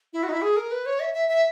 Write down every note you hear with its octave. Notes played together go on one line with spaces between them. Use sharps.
E4
F#4
D#4
E4
G#4
A#4
B4
C#5
E5
E5
E5